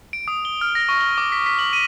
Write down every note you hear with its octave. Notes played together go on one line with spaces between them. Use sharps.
D7
D#6
G7
F6
A#6
C#6
G7
D6
B6
B6
F#7
D#7